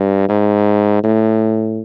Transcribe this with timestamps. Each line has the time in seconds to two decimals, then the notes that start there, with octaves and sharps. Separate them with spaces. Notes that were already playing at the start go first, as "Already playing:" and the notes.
Already playing: G2
0.29 G#2
1.04 A2